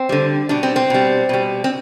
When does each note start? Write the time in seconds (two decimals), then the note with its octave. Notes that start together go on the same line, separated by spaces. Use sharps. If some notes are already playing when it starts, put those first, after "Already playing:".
Already playing: C4
0.09 D3 G3
0.49 B2 G3 D4
0.63 C4
0.76 C4
0.90 B2 G3
1.29 B2 G3
1.64 C4